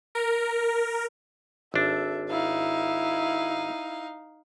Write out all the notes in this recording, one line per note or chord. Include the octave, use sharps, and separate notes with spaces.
A#4
G#1 D4 A4 E5
D#4 E4 F5